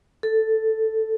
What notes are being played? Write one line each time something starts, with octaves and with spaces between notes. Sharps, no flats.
A4